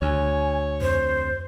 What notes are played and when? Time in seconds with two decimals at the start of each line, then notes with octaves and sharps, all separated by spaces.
0.02 D2 C#5 G#5
0.81 F2 C5